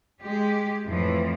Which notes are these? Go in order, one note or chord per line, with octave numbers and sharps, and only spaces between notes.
G#3 G4
F2 A2 E3 F3